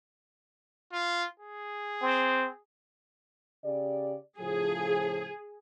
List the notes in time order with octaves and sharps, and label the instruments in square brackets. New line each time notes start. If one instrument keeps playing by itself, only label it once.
[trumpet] F4
G#4
[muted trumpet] C4
[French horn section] C#3 G4 D5
[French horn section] A2 C#3 F3 [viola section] G#4